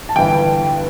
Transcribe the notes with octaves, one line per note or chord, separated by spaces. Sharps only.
A5
G1 G2 E3 G5